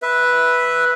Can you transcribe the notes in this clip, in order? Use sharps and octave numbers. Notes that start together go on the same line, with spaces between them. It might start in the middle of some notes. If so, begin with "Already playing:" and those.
B4 E5